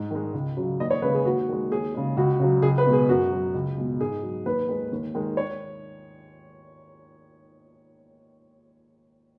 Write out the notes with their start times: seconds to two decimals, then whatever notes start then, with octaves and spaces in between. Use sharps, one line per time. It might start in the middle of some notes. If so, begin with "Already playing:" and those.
Already playing: G#2
0.11 D#3 G#3
0.34 C#2
0.57 C#3 F#3
0.80 D#2 D#5
0.91 C#5
1.02 C#3 G#3 B4
1.14 G#4
1.25 D#2 F#4
1.48 D#3 G#3
1.71 D#2 G#4
1.94 C#3 G#3
2.17 C#2 F#4
2.40 C#3 F#3
2.62 C#2 G#4
2.78 B4
2.86 B2 G#3
2.93 G#4
3.08 F#2 F#4
3.32 F#3
3.54 C#2
3.77 B2 G#3
4.00 G#2 G#4
4.22 F#3
4.46 D#2 B4
4.69 D#3 G#3
4.92 D#2
5.15 D#3 G#3
5.37 C#5